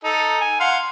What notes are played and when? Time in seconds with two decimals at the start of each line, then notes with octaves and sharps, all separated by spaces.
0.04 D#4 A4
0.41 G#5
0.60 F5 F#5 C6